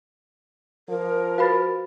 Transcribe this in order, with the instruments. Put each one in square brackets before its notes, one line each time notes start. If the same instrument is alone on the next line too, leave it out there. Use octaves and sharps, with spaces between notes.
[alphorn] F3 [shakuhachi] A#4
[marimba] F#4 B4 C5 [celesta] F5 B5 A6